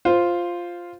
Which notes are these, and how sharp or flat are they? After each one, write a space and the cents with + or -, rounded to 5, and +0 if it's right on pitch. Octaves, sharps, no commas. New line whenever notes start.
F4 +0 C5 +0